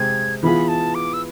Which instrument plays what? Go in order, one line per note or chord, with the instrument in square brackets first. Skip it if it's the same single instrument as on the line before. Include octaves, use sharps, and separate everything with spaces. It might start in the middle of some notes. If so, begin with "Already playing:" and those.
Already playing: [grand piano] C3 G#3 C4 [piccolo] G#6
[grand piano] E3 B3 F4 G#4 [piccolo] B5
[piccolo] A5
D6
E6